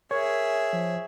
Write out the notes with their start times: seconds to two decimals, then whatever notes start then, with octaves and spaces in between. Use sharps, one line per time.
0.11 G#4 A#4 C#5 E5
0.73 F3